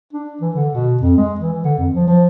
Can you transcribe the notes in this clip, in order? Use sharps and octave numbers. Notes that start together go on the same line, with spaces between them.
D4
E3
D3
B2
F2
G#3
E3
D3
F2
F3
F3